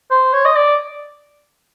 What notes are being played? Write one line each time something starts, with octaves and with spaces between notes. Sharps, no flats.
C5
C#5
D#5
D5